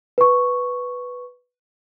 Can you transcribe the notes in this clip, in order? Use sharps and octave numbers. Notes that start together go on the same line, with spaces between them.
B4 C#6